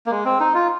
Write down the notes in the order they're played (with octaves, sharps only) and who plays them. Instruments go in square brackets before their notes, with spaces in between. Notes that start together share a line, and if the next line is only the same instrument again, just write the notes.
[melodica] A#3
G#3
C4
D#4
F4